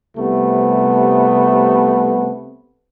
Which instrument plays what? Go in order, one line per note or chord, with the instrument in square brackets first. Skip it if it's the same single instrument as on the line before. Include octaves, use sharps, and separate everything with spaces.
[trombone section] C2 C3 A3 B3